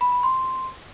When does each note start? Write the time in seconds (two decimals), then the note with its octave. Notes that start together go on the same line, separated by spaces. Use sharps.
0.01 B5
0.12 B5
0.23 C6